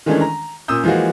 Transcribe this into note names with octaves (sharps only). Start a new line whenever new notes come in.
D#3 E3 G#3 A3 C#4 D4
A#5
A#2 C#4 D#6 E6 G6
E3 F3 G#3 A#3 F#4